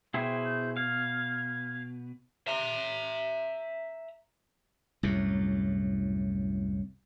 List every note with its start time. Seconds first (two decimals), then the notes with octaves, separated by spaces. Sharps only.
0.14 B2 E4 G#4 C5 G5
0.45 G6
0.77 F5 G#6
2.47 E5 A#5
5.03 C2 F#2 A2